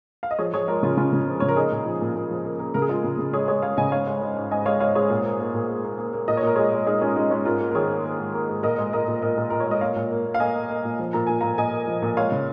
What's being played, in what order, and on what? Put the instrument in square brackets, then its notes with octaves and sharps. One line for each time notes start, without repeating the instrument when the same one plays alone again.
[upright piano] F5
D#5
F3 G#4 C#5
F3 G#4 C#5
G#3 F4 A#4
C#3 C#4 F4
C#3 C#4 F4
C#3
F3
C#3 C#5
A#4
A#3 D#4 G#4
A#2
F3
A#2
A#2
F3
A#3
A#3
C#3 A#4
G#4
G#3 F4 A#4
C#3
C#3
G#3 G#4 C#5
G#3 G#4 C#5
G#3 C#5 F5
C#3 D#5 G#5
G#2 C#5 F5
G#3
G#3
G#2
G#2 D#5 G#5
G#3 C#5 F5
G#3 C#5 F5
G#2 G#4 C#5
A#2
A#3
A#3
A#2
A#3
A#3
A#3
A#3
A#2 D#5
C#5
A#2 A#4
G#3 G#4 C#5
G#3
G#3 D#4 G#4
G#3 C#4 F4
G#3 D#4
G#3 C#4
G#2 F4 A#4
A#3
A#4
D#3 G#4 C#5
A#3
A#3
G#2
A#3
G#2
A#2 A#4 D#5
G#3
A#2 A#4 D#5
A#2
A#2 A#4 D#5
A#2
A#2 A#4
C#5
G#3 D#5
A#2 C#5 F5
A#2
A#3
A#3
F5
A#3 D#5 G#5
A#3
A#3
A#2
F3
A#2 A#5
A#2 G#5
A#2 F5 A#5
A#2 D#5 G#5
A#3
F3
A#2
G#3 C#5 F5
C#3